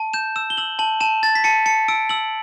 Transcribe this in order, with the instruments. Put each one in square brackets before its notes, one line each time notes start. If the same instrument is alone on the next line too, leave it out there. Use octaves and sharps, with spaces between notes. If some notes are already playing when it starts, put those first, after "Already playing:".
Already playing: [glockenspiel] A5
G6 E7
E6 E7
G7
E6 F#7
A5 F#7
A5 E7
A5 A6
B6
A5 C#7
A5 C#7
E6 D7
E6 F#7